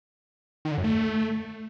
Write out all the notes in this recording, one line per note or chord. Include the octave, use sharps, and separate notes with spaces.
D#3
D3
F#2
A3